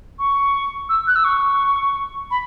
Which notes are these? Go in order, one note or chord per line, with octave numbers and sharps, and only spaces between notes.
C#6
E6
F#6
E6
C#6
B5